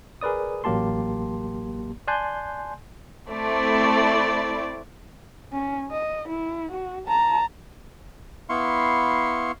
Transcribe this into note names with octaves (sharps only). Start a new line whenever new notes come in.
G#4 A#4 B4 D5 D#6
A1 F#3 A#3 G4 A5 C6
D5 G#5 A5 C6 F#6 G6
A3 C4 E4 D5
C#4
D#5
E4
F#4
A5 A#5
B3 E4 F5 C6 C#6